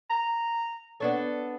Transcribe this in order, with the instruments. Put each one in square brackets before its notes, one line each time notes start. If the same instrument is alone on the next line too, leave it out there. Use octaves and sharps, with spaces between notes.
[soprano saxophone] A#5
[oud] B3 D4 C#5 [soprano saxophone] A4